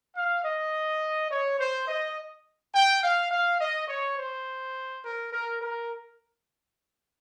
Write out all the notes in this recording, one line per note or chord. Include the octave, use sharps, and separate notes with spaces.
F5
D#5
C#5
C5
D#5
G5
F5
F5
D#5
C#5
C5
A#4
A#4
A#4